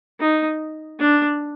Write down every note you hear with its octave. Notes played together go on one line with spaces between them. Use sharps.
D#4
D4